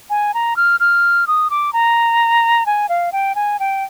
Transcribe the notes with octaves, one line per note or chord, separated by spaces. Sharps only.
G#5
A#5
F6
F6
D#6
D6
A#5
G#5
F5
G5
G#5
G5